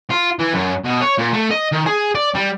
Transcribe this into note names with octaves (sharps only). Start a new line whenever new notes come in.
F4
E3
F#2
B2
C#5
A#2
A3
D#5
D#3
G#4
D5
G3